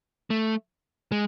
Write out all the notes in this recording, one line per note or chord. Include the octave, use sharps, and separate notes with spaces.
A3
G#3